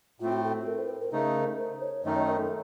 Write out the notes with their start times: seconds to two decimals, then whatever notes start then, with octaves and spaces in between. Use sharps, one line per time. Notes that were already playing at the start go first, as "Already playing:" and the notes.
0.20 A2 A3 C4 F4
0.32 F#4
0.43 A4
0.67 A#4
0.78 C5
0.89 A#4
1.01 A#4
1.12 C#3 A3 D#4
1.58 C5
1.81 C#5
2.04 F#2 D#3 A3 D#4 D#5
2.16 C#5
2.28 A#4
2.39 A4